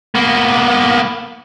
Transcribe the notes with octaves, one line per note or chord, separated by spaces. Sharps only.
A#3 B3